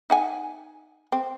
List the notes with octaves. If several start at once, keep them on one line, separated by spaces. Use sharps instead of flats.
D#4 F#5 G#5
C4